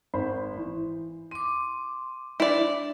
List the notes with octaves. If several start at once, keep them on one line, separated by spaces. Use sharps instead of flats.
G#1 C5 B5
E3
C6 D6 D#7
D4 E4 D5